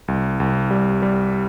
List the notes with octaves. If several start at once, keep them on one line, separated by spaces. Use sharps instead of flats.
C2
C2
G3
G3